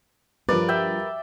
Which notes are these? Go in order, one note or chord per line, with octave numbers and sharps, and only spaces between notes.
G2 F3 A#4 B4 D5
E5 G5